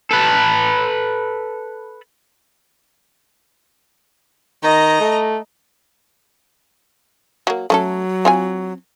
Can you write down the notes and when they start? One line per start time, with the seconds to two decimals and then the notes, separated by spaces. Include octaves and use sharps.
0.11 A4 B4
4.63 D#3 D#5 A#5
5.00 A3
7.47 F#3 A#3
7.70 F#3 A3 C#4 A4
8.25 C4 F4 G#5